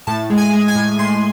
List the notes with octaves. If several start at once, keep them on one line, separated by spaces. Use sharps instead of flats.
A2 A5
G#3
G#5
G#3
G#5
A2
A2 C6